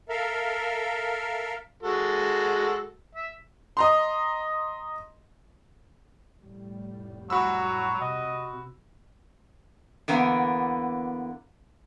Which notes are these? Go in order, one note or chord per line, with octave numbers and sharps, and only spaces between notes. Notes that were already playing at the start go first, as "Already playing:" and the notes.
A4 A#4 E5 F5
G#3 F#4 A4
E5
D#5 A#5 C6
F1 A2 G3
F#3 F#4 B5 E6
C3 D#5
E2 D3 A#3 B3